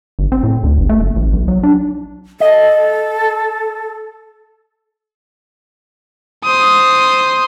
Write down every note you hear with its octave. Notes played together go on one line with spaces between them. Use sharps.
G1
C4
A2
D2
G1
A3
F#1
A1
B1
F#3
D4
A4 D#5
C5 D#6